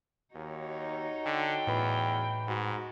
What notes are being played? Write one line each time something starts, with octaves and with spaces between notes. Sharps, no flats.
D#2 D#4 F#4 C#5
D3 G5
E2 A2 B4 B5
G#2 F#4